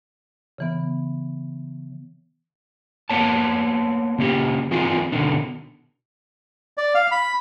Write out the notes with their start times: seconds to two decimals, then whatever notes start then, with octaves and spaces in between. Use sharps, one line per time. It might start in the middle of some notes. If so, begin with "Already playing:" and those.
0.58 C#3 E3 B3
3.10 A#3 B3 C#5 A5
4.18 C#3 A#3 C#4 G4
4.71 D#3 E3 C4 F4 G#4
5.12 B2 D3 D#3
6.77 D5
6.95 F5
7.11 B5